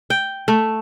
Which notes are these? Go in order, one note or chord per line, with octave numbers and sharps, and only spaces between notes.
G5
A3